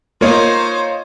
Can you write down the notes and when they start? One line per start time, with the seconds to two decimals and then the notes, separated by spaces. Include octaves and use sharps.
0.21 A#3 D#4 F4 C5 C#5 D#5